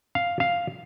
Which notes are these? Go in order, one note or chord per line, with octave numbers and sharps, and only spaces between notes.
F5
F5